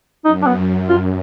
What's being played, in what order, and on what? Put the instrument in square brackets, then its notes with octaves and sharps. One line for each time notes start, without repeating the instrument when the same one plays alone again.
[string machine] F#2 [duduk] D#4
[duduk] D4
B3
F4